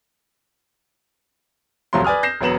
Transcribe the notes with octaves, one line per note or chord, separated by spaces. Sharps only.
D#1 C2 F3 F#3 A3 C6
B4 D5 G#5 D#6 F6
G6 A#6 C7 E7
E1 F#3 B3 E7 F#7